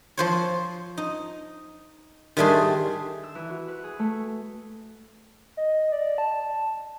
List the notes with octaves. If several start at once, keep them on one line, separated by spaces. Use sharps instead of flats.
F3 C5 C#5
D#4
D#3 G3 A3 D4 G#4 C6
E6
E3
F#4
B4
G#4
A3
D#5
D5
A5